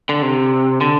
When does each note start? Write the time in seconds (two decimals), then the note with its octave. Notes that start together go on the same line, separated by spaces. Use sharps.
0.09 D3
0.22 C3
0.81 D3